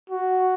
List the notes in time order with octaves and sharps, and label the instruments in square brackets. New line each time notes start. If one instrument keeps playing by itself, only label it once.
[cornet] F#4